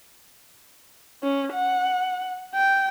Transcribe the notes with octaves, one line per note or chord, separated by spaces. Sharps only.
C#4
F#5
G5